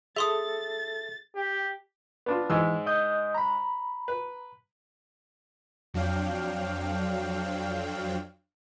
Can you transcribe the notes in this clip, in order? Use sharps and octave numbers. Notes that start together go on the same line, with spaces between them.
G#4 A4 E5 C6 D#6 A6
G4
B3 D4 F4
G#2 E3 G#3 E6
D#5 D#6 G6
A#5 B5
B4
F2 F#3 D4 F5 G5